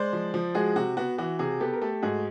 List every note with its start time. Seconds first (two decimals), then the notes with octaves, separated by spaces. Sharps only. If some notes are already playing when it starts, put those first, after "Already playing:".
Already playing: G#3 C5 D5
0.13 F3
0.34 F3
0.55 G#3 F#4 G#4
0.76 C3 F#4
0.97 B3 F#4
1.18 E3 F#4
1.39 C3 F#4 G#4
1.60 B3 G4 A4
1.73 A#4
1.82 A3 G4 A4
2.02 G#2 F#4 G#4